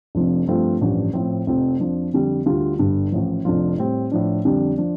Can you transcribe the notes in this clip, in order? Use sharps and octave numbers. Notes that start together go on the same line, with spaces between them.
F1 F2 F3 D4
G2 F3 A3 C4 F4
A1 G2 F3 D4
A2 F3 C4
F1 F2 F3 C4
F2 F3 D4
F2 D3 G3
D2 D3 G3 F4
G1 G2 D3 G3
A1 A2 F3
F1 F2 F3 D4 F4
A2 G3 C4
A2 F3 D4
F2 D3 G3 D4
F3 D4